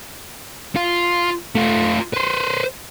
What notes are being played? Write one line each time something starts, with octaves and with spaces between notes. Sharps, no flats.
F4
A3 F4
B4 C5